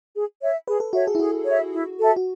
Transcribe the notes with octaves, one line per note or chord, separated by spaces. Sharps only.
G#4
C#5 E5
G#4 B4
A4
F#4 C#5 E5
G#4
E4
F#4 G#4
C#5 E5
E4
A4 E5 A5
F#4